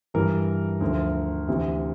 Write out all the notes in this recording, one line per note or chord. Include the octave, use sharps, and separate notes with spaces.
G2 E3 G3 A#4
D2 D3 F3
D2 C3 E3